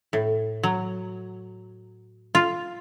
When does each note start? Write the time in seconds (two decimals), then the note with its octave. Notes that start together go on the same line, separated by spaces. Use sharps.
0.13 A2
0.63 F#3
2.35 F4